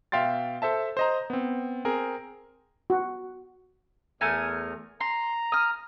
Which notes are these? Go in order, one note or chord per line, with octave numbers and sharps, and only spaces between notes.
B2 E5 F5 G5 C6 A6
A4 C5 E5 A5
C5 D#5 A#5
B3 C4
C4 G#4 A#4
F#4
E2 A3 A#4 G#5
A#5 C6
D#6 F6